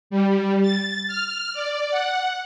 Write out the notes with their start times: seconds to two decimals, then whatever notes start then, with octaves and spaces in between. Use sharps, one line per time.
0.10 G3
0.62 A6
1.08 F6
1.54 D5
1.91 F#5